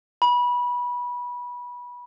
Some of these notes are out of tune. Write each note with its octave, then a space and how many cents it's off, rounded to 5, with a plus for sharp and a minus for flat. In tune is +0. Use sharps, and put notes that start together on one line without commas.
B5 -20